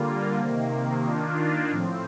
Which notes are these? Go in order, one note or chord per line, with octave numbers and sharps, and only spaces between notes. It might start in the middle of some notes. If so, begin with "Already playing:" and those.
Already playing: D3 G3 A#3 F4
C3 D#3 A#3
D#3 A#3 D4 F4
A2 F3 C4